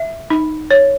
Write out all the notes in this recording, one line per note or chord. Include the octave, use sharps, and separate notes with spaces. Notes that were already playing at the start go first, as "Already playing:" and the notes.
Already playing: E5
D#4
C#5